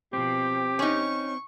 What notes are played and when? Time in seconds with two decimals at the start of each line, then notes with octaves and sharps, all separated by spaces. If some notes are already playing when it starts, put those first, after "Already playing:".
0.13 B2 F3 C4 G4
0.79 C#4 D#4 C#6